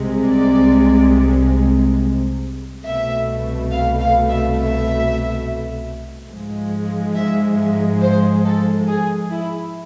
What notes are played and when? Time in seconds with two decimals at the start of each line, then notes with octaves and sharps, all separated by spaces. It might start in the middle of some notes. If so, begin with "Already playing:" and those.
Already playing: C2 C3 G#3
0.25 D5
2.84 C2 B2 A3 E5
3.71 F5
3.99 F5
4.28 E5
4.57 E5
6.29 G#2 F3 G#3
7.15 E5
8.01 C5
8.45 A4
8.88 G#4
9.31 E4